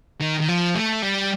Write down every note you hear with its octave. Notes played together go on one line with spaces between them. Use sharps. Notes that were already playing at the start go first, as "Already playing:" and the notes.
D#3
D#3
F3
A3
G3